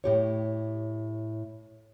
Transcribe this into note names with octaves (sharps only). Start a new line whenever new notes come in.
A2 G4 C#5